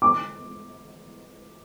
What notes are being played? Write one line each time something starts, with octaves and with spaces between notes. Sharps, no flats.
D6